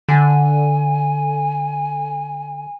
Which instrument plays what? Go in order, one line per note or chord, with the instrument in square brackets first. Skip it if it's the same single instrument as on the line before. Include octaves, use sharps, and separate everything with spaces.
[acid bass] D3 [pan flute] G#5